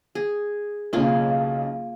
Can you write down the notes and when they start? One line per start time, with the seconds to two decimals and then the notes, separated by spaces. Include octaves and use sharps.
0.15 G#4
0.93 B1 C#3 A#3 F4 G#4